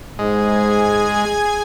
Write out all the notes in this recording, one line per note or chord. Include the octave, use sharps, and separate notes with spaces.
G#2 G#3 G#4 G#5 G#6